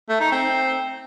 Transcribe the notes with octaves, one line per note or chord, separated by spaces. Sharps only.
A3
D#4
C4